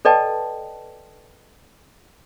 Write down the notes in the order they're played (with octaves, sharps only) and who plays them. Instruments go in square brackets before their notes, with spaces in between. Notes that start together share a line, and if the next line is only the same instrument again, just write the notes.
[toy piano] A4 B4 D5 D#5 G5 A5